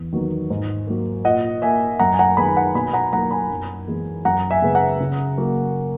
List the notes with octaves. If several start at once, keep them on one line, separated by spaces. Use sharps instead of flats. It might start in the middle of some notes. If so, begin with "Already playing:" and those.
Already playing: E2
D#3 F#3 B3
G#2
F#3 A#3
A#2 D#5 F#5
A#3 E5 G#5
F#2 F#5 A#5
G#5
F#5 A#5
D#3 G#3 B3 G#5 B5
F#5 A#5
B2 G#5 B5
F#5 A#5
F#3 A#3 F#5 A#5
G#5 B5
F#2
E3 G#3 B3
F#2 F#5 A#5
E5 G#5
C#3 G#3 B3
F#5 A#5
C#3
F#3 A#3